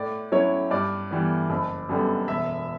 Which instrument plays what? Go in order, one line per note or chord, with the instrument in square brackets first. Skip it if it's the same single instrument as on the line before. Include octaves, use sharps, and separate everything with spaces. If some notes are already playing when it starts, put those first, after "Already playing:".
Already playing: [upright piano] A2 D5
F#3 C#4 E4 C#5
G2 D5
E3 G3 B3
F#1
F#2 D3 G3 B3
E1 E5